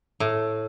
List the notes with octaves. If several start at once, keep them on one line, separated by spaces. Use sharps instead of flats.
A2